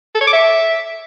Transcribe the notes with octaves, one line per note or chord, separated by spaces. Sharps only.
A4
C#5
D6
E5